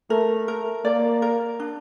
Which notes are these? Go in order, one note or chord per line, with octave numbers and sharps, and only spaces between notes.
A3 A#4
A#4
A#3 D5
A#4
D4